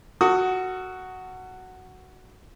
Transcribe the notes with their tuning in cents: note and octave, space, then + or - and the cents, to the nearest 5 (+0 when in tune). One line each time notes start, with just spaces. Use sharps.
F#4 +5 A4 +45 D#6 +25